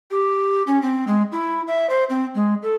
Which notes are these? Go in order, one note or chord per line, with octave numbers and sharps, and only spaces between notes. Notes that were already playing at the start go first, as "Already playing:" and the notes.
G4
C#4
C4
G#3
E4
E5
C5
C4
G#3
A4